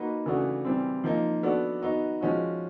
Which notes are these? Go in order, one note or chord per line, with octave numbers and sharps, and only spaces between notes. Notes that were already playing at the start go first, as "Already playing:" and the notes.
Already playing: A#3 D#4 F#4 B4
C#3 E3 A3 D4 F#4
E3 G3 C4
F3 A#3 D#4
B3 D4 F#4 A4 D5
B3 D#4 F#4
F3 G#3 C#4 F#4